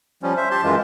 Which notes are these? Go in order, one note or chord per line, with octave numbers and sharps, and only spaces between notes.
F3 G3 C#4
C5 E5
G4 A5 C6
F#2 E3 G#3 F4